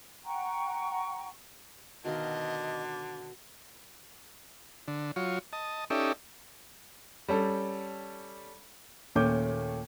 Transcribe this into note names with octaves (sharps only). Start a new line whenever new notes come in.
F#5 G5 A#5 C#6
B2 D3 D#3 D#5 F5
D3
F#3 F4 C#5
D#5 A5
C#4 D#4 G4 A4 D5 E5
G3 C#4 A4
D#2 A#2 A3 C#4 D6 G6